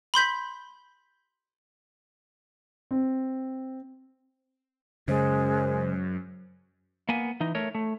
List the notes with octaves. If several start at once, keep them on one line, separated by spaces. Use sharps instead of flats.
B5 C6 G6 B6
C4
F#2 C#3 G#3 C5
A#3 B3 G#5
E3 D#4
A3 A#4 C#5
A3